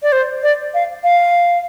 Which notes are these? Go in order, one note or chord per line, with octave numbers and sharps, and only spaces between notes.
D5
C5
D5
F5
F5